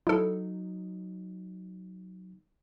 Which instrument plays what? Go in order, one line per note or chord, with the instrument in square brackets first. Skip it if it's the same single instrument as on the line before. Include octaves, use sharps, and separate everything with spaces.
[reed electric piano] F#3 D#4 [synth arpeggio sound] E4 A4